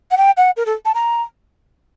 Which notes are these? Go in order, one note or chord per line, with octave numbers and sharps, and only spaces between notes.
F#5
G5
F#5
A#4
A4
A5
A#5